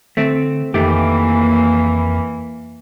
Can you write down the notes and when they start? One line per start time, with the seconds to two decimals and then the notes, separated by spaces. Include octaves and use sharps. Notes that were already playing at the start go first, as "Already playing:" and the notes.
0.17 D3 A3 C4
0.74 F2 D#3 E3 A3 A#3 G4